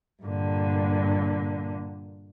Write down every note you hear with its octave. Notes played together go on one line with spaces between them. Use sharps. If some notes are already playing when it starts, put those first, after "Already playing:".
G2 A#2 D3